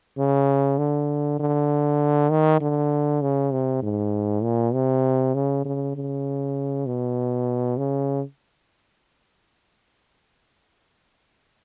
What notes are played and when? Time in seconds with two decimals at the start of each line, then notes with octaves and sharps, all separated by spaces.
0.18 C#3
0.78 D3
1.40 D3
2.31 D#3
2.61 D3
3.22 C#3
3.53 C3
3.83 G#2
4.43 A#2
4.74 C3
5.35 C#3
5.65 C#3
5.96 C#3
6.87 B2
7.77 C#3